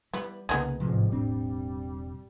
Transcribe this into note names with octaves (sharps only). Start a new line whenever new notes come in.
E3 G3 B3
C2 C#3 A#3 B3 D#4 G#4
A1 G#2 C3 F3 G#3
E1 G3 C4 D4